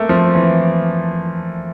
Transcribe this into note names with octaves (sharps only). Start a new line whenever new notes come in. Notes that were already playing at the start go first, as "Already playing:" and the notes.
Already playing: A3 A#3
F3
E3